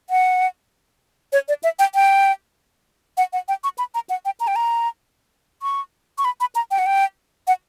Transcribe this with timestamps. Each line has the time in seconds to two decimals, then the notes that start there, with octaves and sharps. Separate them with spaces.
0.10 F#5
1.33 C#5
1.48 D5
1.63 E5
1.79 G5
1.95 G5
3.17 F#5
3.33 F#5
3.48 G5
3.64 C#6
3.78 B5
3.94 A#5
4.10 F#5
4.25 G5
4.40 A#5
4.48 G5
4.56 A#5
5.62 C#6
6.18 C#6
6.25 B5
6.40 B5
6.55 A#5
6.71 G5
6.79 F#5
6.86 G5
7.47 F#5